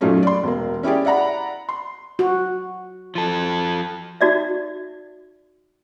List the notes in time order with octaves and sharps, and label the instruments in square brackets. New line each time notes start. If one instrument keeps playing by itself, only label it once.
[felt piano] F#2 A#2 F#3 A3 C#4 D#4
D5 C6
E1 A#3
C#4 E4 G4 G#4 D5
D5 E5 F#5 A#5 B5
C6
[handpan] F#4
[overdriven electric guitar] F3 A4
[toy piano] D#4 F#4 D5 E5